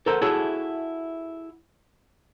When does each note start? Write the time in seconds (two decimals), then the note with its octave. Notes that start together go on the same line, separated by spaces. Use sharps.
0.06 A4 A#4 C5 F#5
0.21 E4 F#4 G#4 A4 C#5 E5